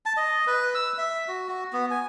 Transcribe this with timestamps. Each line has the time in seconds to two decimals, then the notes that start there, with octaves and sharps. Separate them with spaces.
0.06 A5
0.17 D#5
0.47 B4
0.75 E6
0.98 E5
1.28 F#4
1.49 F#4
1.73 B3
1.91 G#5